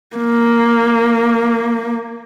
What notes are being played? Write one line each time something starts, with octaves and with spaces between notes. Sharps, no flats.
A#3